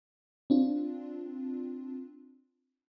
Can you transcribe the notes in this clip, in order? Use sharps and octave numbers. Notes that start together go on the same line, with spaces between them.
C4 D4 F4